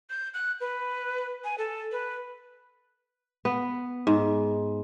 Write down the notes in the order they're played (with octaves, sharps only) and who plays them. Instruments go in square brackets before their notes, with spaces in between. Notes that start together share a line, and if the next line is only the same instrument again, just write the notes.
[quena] G6
F#6
B4
G#5
A4
B4
[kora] B3
G#2